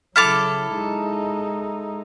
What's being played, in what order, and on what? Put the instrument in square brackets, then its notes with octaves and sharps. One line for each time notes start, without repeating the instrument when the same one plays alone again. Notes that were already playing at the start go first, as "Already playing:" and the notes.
[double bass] C#3 F#3 [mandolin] E4 A4 D6 [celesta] F6 A6 F7
[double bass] G#3 D#4